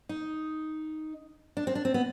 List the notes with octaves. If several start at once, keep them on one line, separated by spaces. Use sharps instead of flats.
D#4
D4
C4
D4
C4
B3